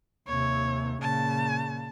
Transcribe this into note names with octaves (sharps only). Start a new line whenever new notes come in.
D#2 C3 C#5
A#2 C#3 A5